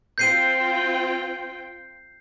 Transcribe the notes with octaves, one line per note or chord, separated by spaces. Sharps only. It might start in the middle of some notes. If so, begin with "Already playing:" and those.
C4 F4 G5 G6 C7 D#7